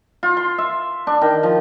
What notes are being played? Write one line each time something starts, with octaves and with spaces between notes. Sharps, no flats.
F4
C6
E5
D4
D#3
F3